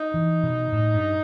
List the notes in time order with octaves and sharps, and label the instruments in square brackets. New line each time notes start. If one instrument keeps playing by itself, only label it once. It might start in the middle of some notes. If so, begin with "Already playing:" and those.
Already playing: [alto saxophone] D#4
[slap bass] E3
B2
A2
G2